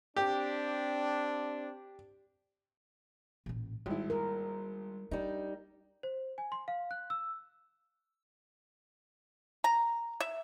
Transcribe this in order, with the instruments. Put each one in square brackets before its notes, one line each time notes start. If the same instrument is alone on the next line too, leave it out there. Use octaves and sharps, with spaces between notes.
[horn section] C4 D4 [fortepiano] G4
[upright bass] A1 A#2
[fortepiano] G#1 E4 [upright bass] G3
[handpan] A#4
[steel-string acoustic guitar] G3 D#4 [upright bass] D4
[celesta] C5
G#5
C6
F5
F#6
E6
[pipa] A#5
E5